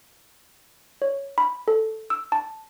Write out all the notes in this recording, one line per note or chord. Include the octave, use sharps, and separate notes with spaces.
C#5
B5
A4
E6
A5